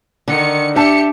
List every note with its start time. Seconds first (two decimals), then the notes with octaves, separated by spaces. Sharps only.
0.28 D3 D#3 C#7
0.76 D4 G4 E5 A5 C#7